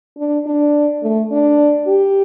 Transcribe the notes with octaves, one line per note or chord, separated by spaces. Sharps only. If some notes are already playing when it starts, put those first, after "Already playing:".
D4
D4
A3
D4
G4